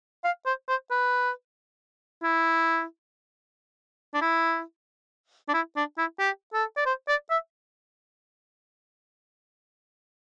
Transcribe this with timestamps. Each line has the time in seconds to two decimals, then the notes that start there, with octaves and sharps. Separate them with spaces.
0.25 F5
0.46 C5
0.69 C5
0.91 B4
2.24 E4
4.14 D4
4.22 E4
5.49 D4
5.54 E4
5.77 D4
5.98 E4
6.19 G4
6.54 A4
6.77 D5
6.86 C5
7.09 D5
7.31 E5